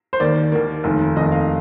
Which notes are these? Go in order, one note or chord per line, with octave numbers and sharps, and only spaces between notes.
C5
D#2 D#3 A#3 D5
D#2 D#3 A#3
F1 D#2 D#3
F1 D#2 D#3 D#5
F5